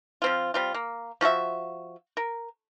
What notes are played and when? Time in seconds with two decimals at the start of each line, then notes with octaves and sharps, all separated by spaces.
0.22 F3 C4 F4
0.54 G3 C4 F4
0.74 A#3
1.21 F3 F#4 A4 E5
2.17 A#4